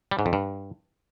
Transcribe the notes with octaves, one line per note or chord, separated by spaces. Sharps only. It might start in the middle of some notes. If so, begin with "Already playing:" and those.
G3
G#2
F2
G2